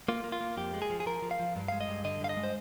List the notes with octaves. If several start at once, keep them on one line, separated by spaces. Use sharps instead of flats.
A#3 F4
A#3
F4
A#3
F2 G4
G#3
G#4
F3
G#4
F3 A#4
F3
F5
F3
G2
G#3 F5
D#5
G2
D3 D#5
G2 F5
D#5
G#3
C5